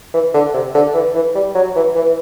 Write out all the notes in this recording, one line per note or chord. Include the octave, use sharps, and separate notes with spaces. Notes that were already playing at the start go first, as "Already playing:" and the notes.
E3
D3
C3
D3
E3
E3
G3
F#3
E3
E3
E3